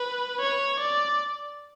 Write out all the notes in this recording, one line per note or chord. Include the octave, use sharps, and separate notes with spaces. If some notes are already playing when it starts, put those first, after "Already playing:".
Already playing: B4
C#5
D5